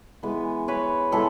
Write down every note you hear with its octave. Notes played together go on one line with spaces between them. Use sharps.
E3 G#3 B3
B4 C#5
E3 G#3 B3 A4 B4